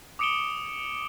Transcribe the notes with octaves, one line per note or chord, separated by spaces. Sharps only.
D6 D#6 C#7 D7 E7 G7